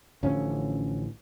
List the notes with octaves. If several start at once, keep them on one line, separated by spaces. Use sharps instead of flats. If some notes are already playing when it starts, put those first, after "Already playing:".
A1 D3 F3 C#4